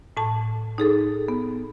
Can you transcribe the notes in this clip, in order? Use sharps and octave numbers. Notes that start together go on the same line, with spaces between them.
A2 A5
D#4 G#4 A4
B3